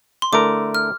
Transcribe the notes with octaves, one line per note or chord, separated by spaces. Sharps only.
C6
D3 A3 E4 A#4 D6
F6